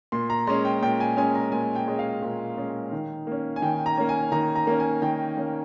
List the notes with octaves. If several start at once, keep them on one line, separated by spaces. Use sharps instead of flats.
A#2 C6
A#5
G#3 C#4 C6
G5
A#2 G5
G#5
G#3 C#4 G#5
A#5
A#2 G#5
G5
G#3 C#4
F5
A#2
G#3 C#4
D#3
A#3 C#4
G#5
D#3 G5
A#5
A#3 C#4
G#5
D#3 A#5
A#5
A#3 C#4
G#5
D#3 G5
A#3 C#4